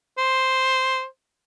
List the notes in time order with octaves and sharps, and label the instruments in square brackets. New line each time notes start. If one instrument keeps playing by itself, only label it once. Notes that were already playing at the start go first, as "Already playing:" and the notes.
[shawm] C5